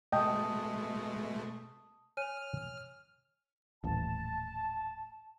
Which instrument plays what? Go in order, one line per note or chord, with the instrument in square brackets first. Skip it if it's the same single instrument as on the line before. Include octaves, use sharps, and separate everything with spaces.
[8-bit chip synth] B2 G#3 A3 [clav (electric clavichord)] D#5 G5 [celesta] A5 D#6
[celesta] C#5 G#5 D#7 [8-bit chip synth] F6
[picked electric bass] D#1 A1 [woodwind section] A5